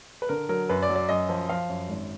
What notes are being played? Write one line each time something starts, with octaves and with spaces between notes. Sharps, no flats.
B4
D3 A#4
F#3 A#4
F#2 B4
D5
F#3
D5
F#2 D#5
F3
F3 F5
F#2
G#1